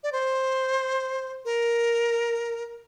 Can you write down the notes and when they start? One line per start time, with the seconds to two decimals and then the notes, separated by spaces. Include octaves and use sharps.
0.03 D5
0.12 C5
1.45 A#4